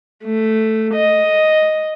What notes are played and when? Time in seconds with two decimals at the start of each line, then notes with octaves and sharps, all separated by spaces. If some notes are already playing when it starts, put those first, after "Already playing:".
0.24 A3
0.94 D#5